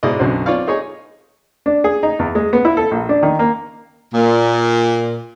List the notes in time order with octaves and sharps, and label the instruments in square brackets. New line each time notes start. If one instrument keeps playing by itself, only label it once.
[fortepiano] G#2 B2 G#3 E4 D5 D#5
B1 F#2 D3 F#3 C4 C5
C4 F4 C#5 D5 F5
D#4 G#4 C#5 G#5
D4
G#4
D#4
E2
G#3
B3
E4
A4
A#1
D4
D#3
A#3
[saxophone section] A#2